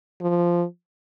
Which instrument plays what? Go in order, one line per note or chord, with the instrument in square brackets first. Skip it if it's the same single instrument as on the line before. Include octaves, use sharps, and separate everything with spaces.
[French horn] F3